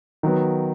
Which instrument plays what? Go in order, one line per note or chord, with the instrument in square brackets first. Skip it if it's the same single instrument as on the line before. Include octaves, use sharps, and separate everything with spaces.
[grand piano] D#3 F#3 B3